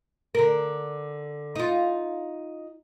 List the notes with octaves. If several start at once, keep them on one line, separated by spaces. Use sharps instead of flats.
D3 A#4
D#4 F4